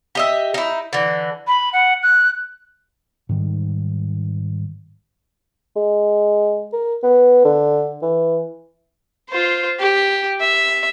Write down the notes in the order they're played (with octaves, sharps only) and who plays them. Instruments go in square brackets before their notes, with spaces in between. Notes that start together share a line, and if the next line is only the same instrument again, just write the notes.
[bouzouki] G4 D#5 E5
D#4 E4
D3 E3
[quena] B5
F#5
F#6
[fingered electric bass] G#2 D#3 G3
[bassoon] G#3
A#4
B3
D3
E3
[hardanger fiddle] F4 C5
G4
E5